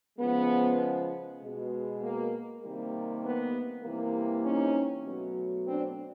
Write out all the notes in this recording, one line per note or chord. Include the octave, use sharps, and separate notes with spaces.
C#3 F3 G#3 B3
B2 G#3
A#3
C3 D#3 G3 A#3
B3
C3 E3 G3 A#3
C#4 D#4
B2 F#3 A3
C4 D4